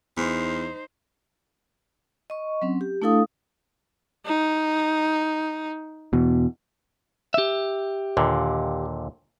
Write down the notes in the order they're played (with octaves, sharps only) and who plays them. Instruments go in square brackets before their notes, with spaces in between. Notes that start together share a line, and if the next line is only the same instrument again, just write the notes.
[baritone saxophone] E2 [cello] D#4 C5
[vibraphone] D#5 C#6
F#3 C4 C#4
G4
A3 D4 E4 A4 F5 D#6
[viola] D#4
[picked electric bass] E2 B2
[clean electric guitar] G4 E5
[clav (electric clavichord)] D#2 A#2 D3